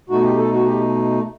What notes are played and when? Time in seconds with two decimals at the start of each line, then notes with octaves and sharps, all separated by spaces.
0.10 B2 A3 D#4 F#4
0.24 G4
0.38 A4
0.52 F#4
0.66 G4